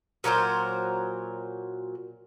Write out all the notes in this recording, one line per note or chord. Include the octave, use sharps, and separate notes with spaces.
A#2 F#3 A#4 C5